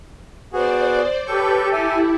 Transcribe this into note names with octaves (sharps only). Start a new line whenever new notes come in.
B3 F#4 G#4 C5 D5
G4 A4 B4 C#5 C#6 G6
E4 E5 G#5